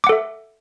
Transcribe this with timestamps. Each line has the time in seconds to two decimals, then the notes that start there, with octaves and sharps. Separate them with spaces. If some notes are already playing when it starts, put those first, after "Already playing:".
0.04 D6
0.07 F#5
0.09 A4
0.12 E5